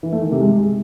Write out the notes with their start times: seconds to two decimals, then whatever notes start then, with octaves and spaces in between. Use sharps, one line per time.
0.03 E3
0.12 A3
0.22 D#3
0.32 C3
0.41 G#3